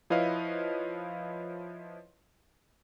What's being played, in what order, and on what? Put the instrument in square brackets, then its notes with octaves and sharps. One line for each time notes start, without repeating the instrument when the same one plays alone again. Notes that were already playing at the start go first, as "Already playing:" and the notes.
[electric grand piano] F3 E4 B4 C#5 D#5 F5